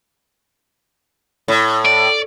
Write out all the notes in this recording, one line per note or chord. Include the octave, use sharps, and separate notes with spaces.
A2
D5